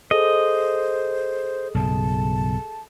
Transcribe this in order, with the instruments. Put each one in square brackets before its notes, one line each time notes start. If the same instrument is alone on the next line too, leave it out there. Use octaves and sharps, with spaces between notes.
[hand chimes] G#4 A4 [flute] C5 [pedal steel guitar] D#5
[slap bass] B1 G2 C#3 [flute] A5